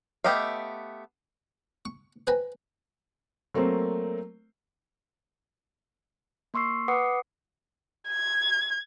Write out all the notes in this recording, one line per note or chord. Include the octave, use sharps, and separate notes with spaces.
A3 B3 G4 D#5 F5
C#6
B4 C5 G5 G#5 A#5 B5
F#3 A3 A#3 C4 C5
A#3 C6 C#6 E6 C7
B4 F#5 D6 D#6 C7 C#7
G#6